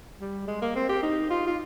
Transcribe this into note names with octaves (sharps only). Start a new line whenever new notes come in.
G3
G#3
A#3
C4
G4
D#4
F4
F4